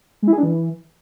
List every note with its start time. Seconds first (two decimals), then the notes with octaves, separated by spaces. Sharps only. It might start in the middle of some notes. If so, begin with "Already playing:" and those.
0.22 G#3
0.28 E4
0.33 G#4
0.38 D4
0.43 E3